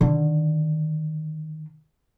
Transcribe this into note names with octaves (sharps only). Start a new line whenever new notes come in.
D3 D#3